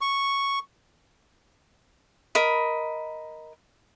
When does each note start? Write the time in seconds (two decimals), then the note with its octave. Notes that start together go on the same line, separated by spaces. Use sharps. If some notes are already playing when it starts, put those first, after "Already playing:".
0.01 C#6
2.35 A#4 D#5 B5